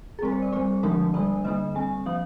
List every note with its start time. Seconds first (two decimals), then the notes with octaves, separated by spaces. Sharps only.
0.19 G#4
0.22 G3 C4 A#4
0.32 C5
0.42 D5
0.52 G3 C4 C5
0.83 D3 F3 G#3 D4 A#4
1.14 G3 A#3 D4 D5
1.44 D3 G3 A#3 D4 D#5
1.75 G3 C4 G#5
2.06 F3 A#3 D4 F5